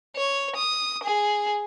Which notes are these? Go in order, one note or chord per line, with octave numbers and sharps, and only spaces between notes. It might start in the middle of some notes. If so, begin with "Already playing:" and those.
C#5
D#6
G#4